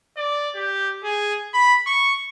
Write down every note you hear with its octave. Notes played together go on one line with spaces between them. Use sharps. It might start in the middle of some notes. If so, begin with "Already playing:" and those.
D5
G4
G#4
B5
C#6